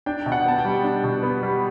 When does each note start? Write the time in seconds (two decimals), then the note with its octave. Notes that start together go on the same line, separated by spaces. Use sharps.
0.06 D4 G5
0.26 B2
0.32 F#5
0.45 B3 A5
0.59 G5
0.65 G3
0.84 D4
1.04 B2
1.23 B3
1.43 G3